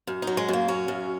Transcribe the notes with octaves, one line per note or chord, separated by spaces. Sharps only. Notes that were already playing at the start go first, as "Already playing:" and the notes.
F#2
D#4
F#3
G#3
F#2 A#3
F#3 C#4
F#2